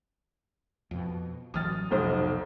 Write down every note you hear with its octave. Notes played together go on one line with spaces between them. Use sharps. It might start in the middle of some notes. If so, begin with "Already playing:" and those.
F2 B2
A1 E3 F#3 D#6 F6 A6
F1 B1 C5